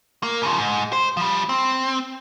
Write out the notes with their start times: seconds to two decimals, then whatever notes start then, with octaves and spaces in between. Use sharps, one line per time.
0.23 A#3
0.43 C#3 F3
0.59 G#2
0.92 C5
1.17 F3 G3
1.49 C4